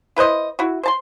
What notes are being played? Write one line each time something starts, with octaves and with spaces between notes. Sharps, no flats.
E4 B4 C5 D#5
E4 F#4
C5 A5 C6